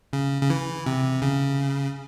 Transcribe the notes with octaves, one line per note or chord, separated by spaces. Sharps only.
C#3
C#3
E3
C3
C#3